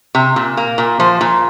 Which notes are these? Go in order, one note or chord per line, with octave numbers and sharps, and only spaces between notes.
C3
A#2
A#3
A#2
F3 C5
A#2